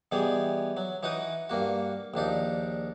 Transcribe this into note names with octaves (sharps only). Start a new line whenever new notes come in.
B2 E3 G3 G#4
F#3
E3 D#4 F#4 B4 D#6
G2 A#3 F#4
A#1 D#2 D4 D#4